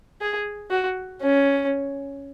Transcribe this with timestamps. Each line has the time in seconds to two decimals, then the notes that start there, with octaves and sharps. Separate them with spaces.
0.21 G#4
0.70 F#4
1.21 C#4